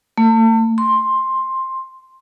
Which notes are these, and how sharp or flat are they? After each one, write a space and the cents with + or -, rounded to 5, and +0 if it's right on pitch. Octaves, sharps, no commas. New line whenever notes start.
A3 +35
C6 +10